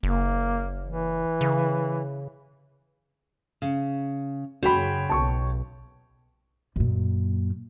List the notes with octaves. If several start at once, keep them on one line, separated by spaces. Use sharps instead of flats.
F#1 A#3
E3
C#3
C#3
F#2 C#3 F#4 C5 C#5 G5 B5
B1 A5 C#6
F#2 A#2